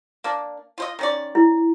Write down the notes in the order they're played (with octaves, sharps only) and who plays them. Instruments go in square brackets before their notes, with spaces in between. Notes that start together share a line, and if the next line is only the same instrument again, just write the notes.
[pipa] A#3 D4
F4 C5 D#5
D#3 C#4 D5
[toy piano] E4